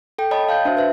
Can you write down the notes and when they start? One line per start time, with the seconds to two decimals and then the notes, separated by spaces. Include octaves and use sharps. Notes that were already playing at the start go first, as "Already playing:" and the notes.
0.18 A4 G5
0.31 C#5 D#5 G5 A5 B5 D#6
0.49 F5 A5 G6
0.65 D4 F#4 C5 E5
0.77 B4 C5 E5